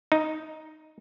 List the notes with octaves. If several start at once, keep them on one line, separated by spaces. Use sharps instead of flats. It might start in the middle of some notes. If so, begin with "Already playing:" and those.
D#4